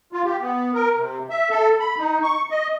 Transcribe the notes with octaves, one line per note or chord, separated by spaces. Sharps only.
F4
G4
B3
A#4
C3
E5
A4
B5
D#4
C#6
D#5